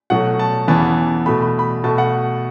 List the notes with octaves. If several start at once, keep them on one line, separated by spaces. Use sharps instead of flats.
B2 F#3 A3 F#5
A5
E2 C#3 E3 B3 A5
B2 A3 B5
B5
B5
B2 A3 A5
F#5